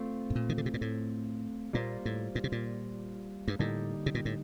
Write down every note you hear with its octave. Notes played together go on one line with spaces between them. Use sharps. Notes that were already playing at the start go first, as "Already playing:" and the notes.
Already playing: A3 C4 F4
A2
A#2
D#3
D3
C3
A#2
A2
A#2 G3 A#3 F4 C5
A2
A#2
C3
A#2
G2
A2 D3 G3 A#3 D#4 G4
C3
A#2
A2